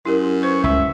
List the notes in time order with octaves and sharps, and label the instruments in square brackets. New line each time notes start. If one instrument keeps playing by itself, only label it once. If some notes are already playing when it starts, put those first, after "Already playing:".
[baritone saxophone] F#2 [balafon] E4 G4 A#4
[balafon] B4 C5 [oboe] C#6
[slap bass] C#2 [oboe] E5